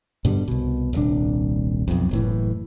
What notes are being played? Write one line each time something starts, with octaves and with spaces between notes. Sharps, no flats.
G2 B2 D3 G3
C2 B2
D#1 C2 D4
B1 F2
F#1 A2 E3